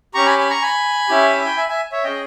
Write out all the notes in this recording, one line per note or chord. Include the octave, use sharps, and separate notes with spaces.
C#4 G4 A#5 C#6
G#5 B5
G#5 B5
A#5 C#6
G#5 B5
C#4 E4 G4
E5
G5
E5 G#5
E5 G#5
C#5 E5
C#4 G#4 D#5 G5